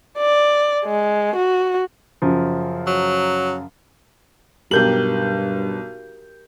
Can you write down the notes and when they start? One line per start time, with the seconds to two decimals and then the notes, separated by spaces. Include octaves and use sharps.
0.18 D5
0.85 G#3
1.35 F#4
2.22 F#2 C#3 F3
2.87 F#3
4.71 B1 G2 G4 A#4 G6 F#7